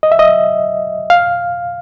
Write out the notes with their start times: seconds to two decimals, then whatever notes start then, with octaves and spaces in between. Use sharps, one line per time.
0.03 D#5
0.12 E5
0.19 D#5
1.10 F5